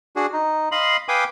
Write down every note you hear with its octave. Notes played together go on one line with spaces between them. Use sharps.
D4 F#4 G#4
D#4
D#5 F5 B5 C6
B4 F5 G5 G#5 D6 D#6